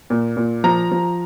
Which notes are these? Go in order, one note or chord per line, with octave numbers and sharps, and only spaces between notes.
A#2
A#2
F3 A#5
F3